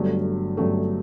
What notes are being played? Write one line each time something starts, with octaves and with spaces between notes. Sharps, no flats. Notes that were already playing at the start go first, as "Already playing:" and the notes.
Already playing: G1 G2 F#3 A3
G1 G2 F#3 A3